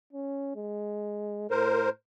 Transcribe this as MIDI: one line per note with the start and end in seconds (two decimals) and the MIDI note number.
0.13 0.53 61
0.56 1.50 56
1.51 1.88 45
1.51 1.90 70
1.51 1.90 72